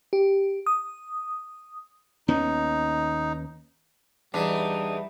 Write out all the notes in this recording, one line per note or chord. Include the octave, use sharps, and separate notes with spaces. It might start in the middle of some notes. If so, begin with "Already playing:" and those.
G4
D#6
D#2 B3 C#4 D#4
E2 E3 G3 D4 D#4